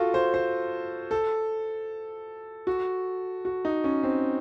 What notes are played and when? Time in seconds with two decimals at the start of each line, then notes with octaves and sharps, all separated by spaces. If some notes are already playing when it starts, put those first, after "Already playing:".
Already playing: F4 F#4 A4
0.14 C5
0.34 C5
1.11 A4
2.67 F#4
3.45 F#4
3.65 D#4
3.84 C#4
4.03 C4